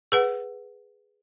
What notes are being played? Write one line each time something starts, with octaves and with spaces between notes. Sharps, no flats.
G#4 B4 F#5